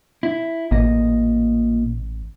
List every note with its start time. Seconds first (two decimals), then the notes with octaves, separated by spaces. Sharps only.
0.23 E4
0.71 A1 A#2 D#5